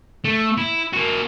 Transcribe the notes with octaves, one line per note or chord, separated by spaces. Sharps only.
A3
E4
A#3 F#4